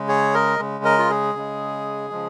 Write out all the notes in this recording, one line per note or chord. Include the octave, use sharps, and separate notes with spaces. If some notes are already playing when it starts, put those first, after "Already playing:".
Already playing: C#3 G#3
G#4 C#5
A#4 D#5
C#3 G#3
A#4 D#5
F4
G#4
C#3 G#3
C#3 F3 G#3